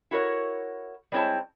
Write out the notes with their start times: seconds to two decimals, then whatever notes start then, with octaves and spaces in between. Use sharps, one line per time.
0.11 E4 F#4 A#4 C#5
1.12 G3 G#3 C4 E4 C#5 A5